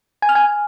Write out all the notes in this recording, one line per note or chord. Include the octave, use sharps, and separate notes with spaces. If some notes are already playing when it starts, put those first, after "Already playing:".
G#5
F6
G#5